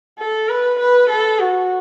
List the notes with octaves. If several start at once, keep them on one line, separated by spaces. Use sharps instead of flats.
A4
B4
B4
A4
F#4